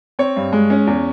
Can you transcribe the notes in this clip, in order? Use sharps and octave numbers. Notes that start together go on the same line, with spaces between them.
C4 C#5
G2
G#3
C#4
E2